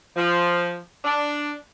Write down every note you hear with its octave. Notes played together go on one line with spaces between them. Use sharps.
F3
D4